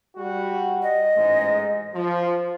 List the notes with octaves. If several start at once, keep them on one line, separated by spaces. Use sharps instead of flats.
G3 F#4
D#5
A1 G#2 G#3
F3 F4